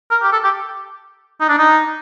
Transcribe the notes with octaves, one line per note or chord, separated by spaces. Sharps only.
A#4
G4
A4
G4
D#4
D4
D#4